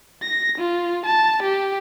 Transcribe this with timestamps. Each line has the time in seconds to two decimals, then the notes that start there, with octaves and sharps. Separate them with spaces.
0.23 A#6
0.58 F4
1.05 A5
1.43 G4